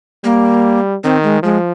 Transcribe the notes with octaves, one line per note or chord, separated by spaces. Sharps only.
G3 A#3
D#3 C4
G#3
F3 G#3